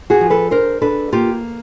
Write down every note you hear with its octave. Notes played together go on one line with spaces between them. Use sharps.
F#4 G#4
F3
A4 B4
D4 A#4 C5
D4 A4 B4
A#3 F4 G4